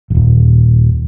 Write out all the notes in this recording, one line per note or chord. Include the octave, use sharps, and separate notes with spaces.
D#1 G#1